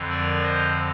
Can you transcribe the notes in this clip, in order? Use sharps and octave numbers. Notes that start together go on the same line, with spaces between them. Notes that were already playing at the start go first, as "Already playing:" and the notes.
Already playing: F2 D3 F3
A#4 D5
C5 D#5